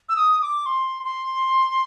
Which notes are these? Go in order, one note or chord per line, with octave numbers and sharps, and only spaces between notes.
E6
D#6
D6
C6
C6